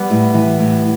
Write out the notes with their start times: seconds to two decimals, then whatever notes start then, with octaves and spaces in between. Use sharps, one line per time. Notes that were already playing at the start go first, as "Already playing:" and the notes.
Already playing: G3 B3
0.10 A2
0.34 E3
0.60 A2